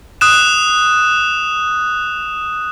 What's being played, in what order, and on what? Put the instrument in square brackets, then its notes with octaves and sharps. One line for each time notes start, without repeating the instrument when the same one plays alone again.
[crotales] D#6 F#6 E7